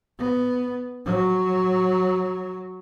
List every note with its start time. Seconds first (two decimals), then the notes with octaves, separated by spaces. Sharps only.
0.19 B3
1.06 F#3